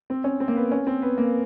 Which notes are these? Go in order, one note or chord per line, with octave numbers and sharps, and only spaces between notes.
C4
C#4
C4
A#3
B3
C#4
C4
B3
A#3